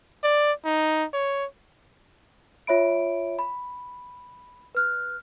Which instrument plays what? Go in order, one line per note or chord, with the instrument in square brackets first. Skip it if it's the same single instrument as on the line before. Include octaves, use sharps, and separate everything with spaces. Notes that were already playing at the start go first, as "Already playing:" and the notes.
[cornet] D5
D#4
C#5
[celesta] F4 C#5 E5 B5 D7
B5
B4 F6 F#6